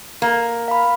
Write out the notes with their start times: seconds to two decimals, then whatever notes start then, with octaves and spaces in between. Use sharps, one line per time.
0.22 A#3
0.68 F5 B5